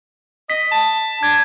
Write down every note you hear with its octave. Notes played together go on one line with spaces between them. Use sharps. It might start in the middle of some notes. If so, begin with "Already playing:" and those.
D#5 B6
A5
D4 G#6